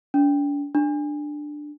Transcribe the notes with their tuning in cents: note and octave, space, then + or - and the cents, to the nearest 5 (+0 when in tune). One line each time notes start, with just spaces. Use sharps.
D4 -40
D4 +10